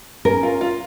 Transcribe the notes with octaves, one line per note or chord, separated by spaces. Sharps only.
C#4 A#4
F4
F4